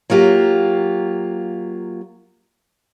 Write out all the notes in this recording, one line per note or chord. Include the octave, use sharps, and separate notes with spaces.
F#3 A#3 F4 G4